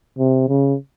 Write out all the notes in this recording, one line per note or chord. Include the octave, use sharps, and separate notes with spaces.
C3
C#3